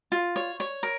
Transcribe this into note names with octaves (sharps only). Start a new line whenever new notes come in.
F4
C#5
C#5
A#4